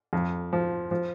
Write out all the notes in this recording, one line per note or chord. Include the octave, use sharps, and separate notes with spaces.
F2
F3
F3